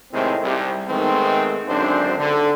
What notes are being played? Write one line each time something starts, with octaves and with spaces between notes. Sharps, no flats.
A2 C3 D#3 G#3 C4
C2
D#3 G#3 A3 B3 C4
G#1 F#2 D3 C4 D4 C5
D3